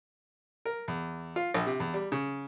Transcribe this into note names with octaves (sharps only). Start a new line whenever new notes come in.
A#4
E2
F4
A#1
C3
E2
G3
C#3